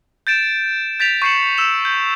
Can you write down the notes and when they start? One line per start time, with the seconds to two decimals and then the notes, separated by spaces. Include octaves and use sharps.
0.27 G6 A6 D7 E7
1.00 G6 A6 B6 D7 F7
1.22 C#6 G6 C7 C#7 E7 F#7
1.58 E6 E7
1.85 G6